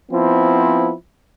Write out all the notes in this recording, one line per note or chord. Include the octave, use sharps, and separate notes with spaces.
F3 B3 C4 E4